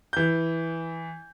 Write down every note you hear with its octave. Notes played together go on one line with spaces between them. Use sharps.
E3 G6